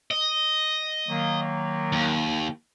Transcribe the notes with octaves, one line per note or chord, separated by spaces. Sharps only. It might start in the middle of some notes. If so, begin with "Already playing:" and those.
D#5
D#3 F#3 A#3
D#2